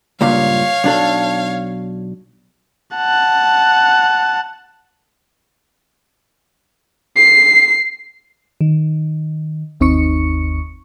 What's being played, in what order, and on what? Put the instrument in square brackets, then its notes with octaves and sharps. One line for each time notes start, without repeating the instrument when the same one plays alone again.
[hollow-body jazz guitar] C#2 G2 A#2 [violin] C#5 F5
[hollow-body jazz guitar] B1 D4 A4
[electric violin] F#5 A5
C7
[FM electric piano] D#3
G1 D#2 C4 D#4 C#6 C#7